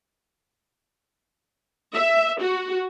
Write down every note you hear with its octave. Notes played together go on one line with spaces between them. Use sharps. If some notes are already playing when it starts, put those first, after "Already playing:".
E5
F#4